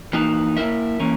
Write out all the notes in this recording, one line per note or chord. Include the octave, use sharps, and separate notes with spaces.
E3 A#3 D#4 F#4
A#3 E4 A#4 E5
E3 A#3 C#4